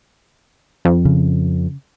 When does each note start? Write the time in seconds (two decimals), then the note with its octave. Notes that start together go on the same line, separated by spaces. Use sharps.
0.85 F2
1.05 C#3